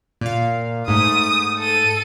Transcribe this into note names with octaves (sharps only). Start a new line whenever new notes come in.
A#2 F5
G#2 A3 D#6
A4 D#7